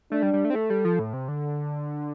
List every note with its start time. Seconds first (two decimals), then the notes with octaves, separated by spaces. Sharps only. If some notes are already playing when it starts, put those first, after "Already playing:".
0.11 A3 D4
0.22 G3
0.33 G3
0.45 A3
0.50 C4
0.55 A3 A4
0.70 G3
0.85 F3
0.99 A2
1.13 C3
1.28 D3